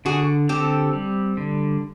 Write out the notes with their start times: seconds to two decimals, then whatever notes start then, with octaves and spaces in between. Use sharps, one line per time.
0.05 D3 F#4 G#4
0.49 C4 G4 A4
0.93 G3
1.37 D3